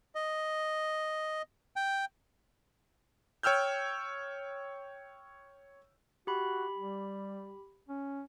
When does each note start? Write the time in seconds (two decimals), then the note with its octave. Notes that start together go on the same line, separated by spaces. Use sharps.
0.15 D#5
1.76 G5
3.43 C#5 G5 E6 F6 G6
6.27 F#4 G4 B5
6.77 G3
7.88 C#4